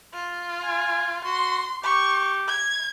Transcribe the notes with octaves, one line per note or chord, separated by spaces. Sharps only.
F4
G#5
F#4 C6
G4 C#6
G#6